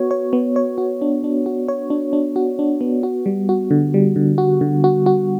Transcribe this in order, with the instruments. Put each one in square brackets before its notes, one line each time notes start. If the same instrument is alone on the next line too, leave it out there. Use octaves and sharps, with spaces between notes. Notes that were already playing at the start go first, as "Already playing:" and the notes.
Already playing: [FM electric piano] B3 F#4 C#5
C#5
B3
C#5
F#4
D4
D4
F#4
C#5
D4
D4
F#4
D4
B3
F#4
G3
F#4
D3
G3
D3
F#4
D3
F#4
F#4